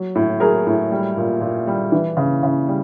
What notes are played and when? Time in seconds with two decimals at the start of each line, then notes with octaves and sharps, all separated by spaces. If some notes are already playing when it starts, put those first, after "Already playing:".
Already playing: F#3
0.15 A2
0.40 F#3 G#4 A#4
0.67 A2
0.92 G3
1.17 A#2
1.41 A#2
1.67 G3
1.92 E3
2.17 C#3
2.43 C#3
2.68 G3